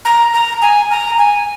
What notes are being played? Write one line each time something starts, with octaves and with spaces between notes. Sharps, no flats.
A#5
A#5
G#5
A#5
G#5